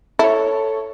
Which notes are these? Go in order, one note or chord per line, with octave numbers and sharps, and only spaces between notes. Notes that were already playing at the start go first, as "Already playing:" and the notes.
E4 A4 C#5